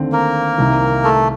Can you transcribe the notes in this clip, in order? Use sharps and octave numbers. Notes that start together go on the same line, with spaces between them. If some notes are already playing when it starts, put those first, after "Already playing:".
Already playing: D#2 D3 A3 C4
A#3 A#4
C2 C3 D#3
A3 A4